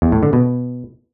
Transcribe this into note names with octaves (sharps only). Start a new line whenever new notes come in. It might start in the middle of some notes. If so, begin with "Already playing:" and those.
E2
A2
D3
B2